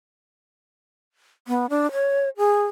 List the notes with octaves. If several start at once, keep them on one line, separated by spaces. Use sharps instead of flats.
B3
D4
C#5
G#4